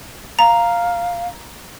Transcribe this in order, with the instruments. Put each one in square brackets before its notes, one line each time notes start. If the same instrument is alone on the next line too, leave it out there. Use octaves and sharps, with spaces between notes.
[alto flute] F5 [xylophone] A#5